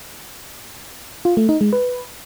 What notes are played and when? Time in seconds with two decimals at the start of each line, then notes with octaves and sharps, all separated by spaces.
1.25 F4
1.37 A3
1.49 D#4
1.61 G#3
1.73 B4